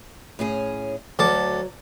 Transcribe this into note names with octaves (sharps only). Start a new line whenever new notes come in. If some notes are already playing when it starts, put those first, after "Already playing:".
A2 C#4 G#4
D2 F#3 A4 D6